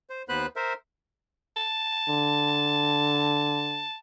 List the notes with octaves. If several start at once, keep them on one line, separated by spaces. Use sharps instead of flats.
C5
D#2 B3 B4 C5 B5 F#6
A#4 C5 E5
A5
D3